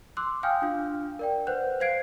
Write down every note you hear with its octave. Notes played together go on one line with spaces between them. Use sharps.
C6 D6 E6 F#6
F5 G5 G#5 D#6 F6 G6
D4 F4 F5
A#4 D5 G5
B4 C5 F#5 F#6 G6
C5 F5 G#6 C7 D7